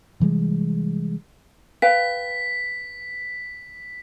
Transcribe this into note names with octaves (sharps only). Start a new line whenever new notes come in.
C3 E3 G3 G#3
B4 F5 G5 B6